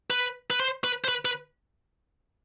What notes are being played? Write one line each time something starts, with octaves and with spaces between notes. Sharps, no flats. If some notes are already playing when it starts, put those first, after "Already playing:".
B4
B4
C5
B4
C5
B4
B4